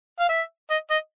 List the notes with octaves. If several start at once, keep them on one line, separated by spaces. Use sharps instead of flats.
F5
E5
D#5
D#5